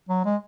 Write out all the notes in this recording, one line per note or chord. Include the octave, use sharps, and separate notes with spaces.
F#3
G#3